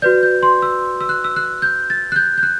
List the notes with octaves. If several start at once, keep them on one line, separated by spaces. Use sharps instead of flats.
F#4 B4 D5 G6
G6
C6
E6
E6
F#6
E6
F#6
G6
A6
F#6
G6
G6
F#6